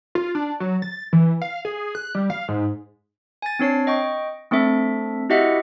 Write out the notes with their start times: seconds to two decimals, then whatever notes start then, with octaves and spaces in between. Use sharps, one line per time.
0.15 F4
0.35 D4
0.60 F#3
0.82 A6
1.13 E3
1.42 F5
1.65 G#4
1.95 F#6
2.15 G3
2.30 F5
2.48 G#2
3.42 G#5 A6
3.59 C4 D4 C#5 C7
3.87 D#5 G5 C#6
4.51 A3 C4 D4 A4 E5
5.30 E4 F#4 G4 D#5 E5 F#5